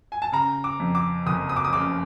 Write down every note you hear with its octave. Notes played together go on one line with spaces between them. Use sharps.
G#5
A5
C#3 A#5
D6
F2
D6
F#1 D#6
D#6
D6
D#6
C#3 D6